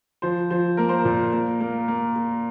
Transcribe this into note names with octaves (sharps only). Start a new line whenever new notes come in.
F3 C5
F3 C5
A#3 A#4
C5
A#4
A#2
A#3
A#3
A#3
A#3